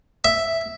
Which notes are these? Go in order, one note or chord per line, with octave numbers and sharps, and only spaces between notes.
E5